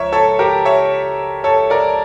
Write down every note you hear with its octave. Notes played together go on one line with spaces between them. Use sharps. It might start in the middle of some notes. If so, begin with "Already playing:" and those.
Already playing: C#2 F3 A#4 C#5 E5
A4 C#5
G4 A#4
C#5 E5
A4 C#5
A#4 D5